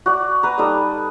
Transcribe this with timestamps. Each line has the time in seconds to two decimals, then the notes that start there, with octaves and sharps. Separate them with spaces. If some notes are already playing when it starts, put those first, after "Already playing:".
0.06 F#4 D5
0.43 B4 A#5
0.58 G3 D#4 A4 D#5